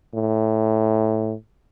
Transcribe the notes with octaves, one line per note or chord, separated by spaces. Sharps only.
A2